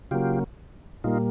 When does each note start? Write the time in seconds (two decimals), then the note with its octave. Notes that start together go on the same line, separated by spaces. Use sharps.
0.11 C#3 F#3 A#3 F4 G4
1.04 A#2 G3 A#3 D#4 F4